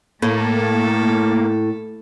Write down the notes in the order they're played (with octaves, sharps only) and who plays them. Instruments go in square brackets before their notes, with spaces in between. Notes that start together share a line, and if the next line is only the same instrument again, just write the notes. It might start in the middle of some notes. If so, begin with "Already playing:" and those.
[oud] A2 [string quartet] A3 A4 [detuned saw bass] A#3